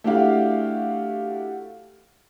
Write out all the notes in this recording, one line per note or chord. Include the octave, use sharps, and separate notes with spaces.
A3 D4 E4 F#4 G4 F5